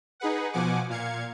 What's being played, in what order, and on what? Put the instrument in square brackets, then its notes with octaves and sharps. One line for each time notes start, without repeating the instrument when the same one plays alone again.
[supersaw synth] D#4 G#4 B4 F#5
B2 F3 F#5 G#5 D6
A#2 F5 G#6 C#7